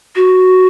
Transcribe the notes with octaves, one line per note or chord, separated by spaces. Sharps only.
F#4